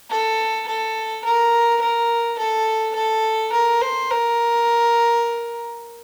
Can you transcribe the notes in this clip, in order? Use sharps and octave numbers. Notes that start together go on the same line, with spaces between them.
A4
A4
A#4
A#4
A4
A4
A#4
C5
A#4